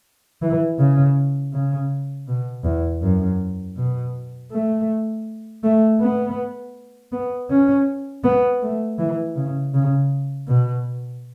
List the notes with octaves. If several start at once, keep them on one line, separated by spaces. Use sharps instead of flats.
E3
C#3
C#3
B2
E2
F#2
B2
A3
A3
B3
B3
C#4
B3
A3
E3
C#3
C#3
B2